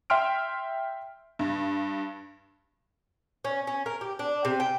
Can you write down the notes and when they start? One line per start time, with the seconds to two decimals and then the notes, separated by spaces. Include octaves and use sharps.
0.10 E5 G5 C6 F6 D7
1.39 G2
3.44 C#4
3.67 C#4
3.86 A#4
4.01 G4
4.19 D4
4.45 C3
4.60 G5